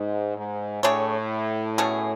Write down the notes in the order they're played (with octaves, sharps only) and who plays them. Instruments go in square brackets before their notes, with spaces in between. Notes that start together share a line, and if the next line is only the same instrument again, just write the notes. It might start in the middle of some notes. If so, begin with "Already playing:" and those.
Already playing: [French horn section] G#2
G#2
[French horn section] A2 [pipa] A3 D4 G#4 C#5
[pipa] B2 A3 C#4 G#4